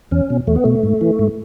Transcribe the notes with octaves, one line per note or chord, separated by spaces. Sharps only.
E2 C#4
B2
E2 A3
B3
B2 A3
G#2
E3
G#2